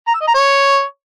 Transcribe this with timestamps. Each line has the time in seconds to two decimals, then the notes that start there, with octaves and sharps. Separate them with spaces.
0.07 A#5
0.14 E6
0.21 D#5
0.28 A#5
0.35 C#5